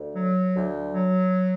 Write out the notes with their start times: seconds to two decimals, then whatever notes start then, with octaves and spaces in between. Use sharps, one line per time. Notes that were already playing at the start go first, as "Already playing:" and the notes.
Already playing: D2
0.15 F#3
0.54 D2
0.93 F#3